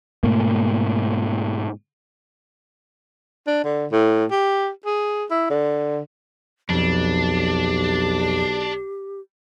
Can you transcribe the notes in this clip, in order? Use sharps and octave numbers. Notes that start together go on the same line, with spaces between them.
G#2 B2 A3 A#3
D4
D3
A2
G4
G#4
E4
D3
B1 F2 D4 G4